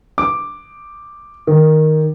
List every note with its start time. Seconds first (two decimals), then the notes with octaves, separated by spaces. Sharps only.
0.18 D6
1.47 D#3